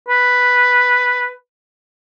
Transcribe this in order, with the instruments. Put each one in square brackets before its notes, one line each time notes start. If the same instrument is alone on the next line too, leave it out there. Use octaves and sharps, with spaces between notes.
[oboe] B4